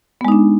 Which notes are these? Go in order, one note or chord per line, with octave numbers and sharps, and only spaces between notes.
G#3 B3 D4 D#4